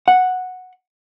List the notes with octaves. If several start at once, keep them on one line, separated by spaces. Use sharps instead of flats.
F#5